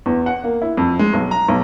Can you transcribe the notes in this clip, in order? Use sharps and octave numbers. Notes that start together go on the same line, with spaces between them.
E2
F#5
A#3
E4
F2
G#3
B1
A#5
B1